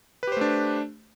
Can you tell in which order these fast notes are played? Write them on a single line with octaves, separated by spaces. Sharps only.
B4 G4 C5 A3 D4